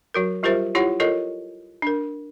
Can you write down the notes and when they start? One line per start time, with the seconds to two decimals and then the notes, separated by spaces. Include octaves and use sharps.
0.14 F#3 F#4 A#4
0.43 G3 F4 G4 A#4 C5 E5
0.75 E4 F4 G4 C#5 F#5
1.00 F4 A4 A#4 C#5 D#5
1.82 D4 A#4